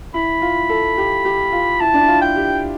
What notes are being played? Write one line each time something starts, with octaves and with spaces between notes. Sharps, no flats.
E4 B5
F4
A4
G4
G4
F4
E4 A5
D4
E4
F4
G5
G4